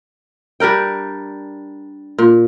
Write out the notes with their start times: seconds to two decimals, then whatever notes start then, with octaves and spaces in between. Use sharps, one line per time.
0.60 G3 D4 A#4 G5
2.18 A#2